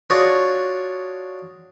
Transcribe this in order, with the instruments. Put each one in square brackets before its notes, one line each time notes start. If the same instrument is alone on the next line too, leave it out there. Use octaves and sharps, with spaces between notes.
[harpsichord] D4 F4 F#4 G#4 C#5